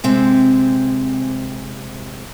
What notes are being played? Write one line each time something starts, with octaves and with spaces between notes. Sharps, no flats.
C3 G#3 C4